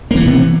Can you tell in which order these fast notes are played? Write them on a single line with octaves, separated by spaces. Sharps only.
A#3 E3 B3 C3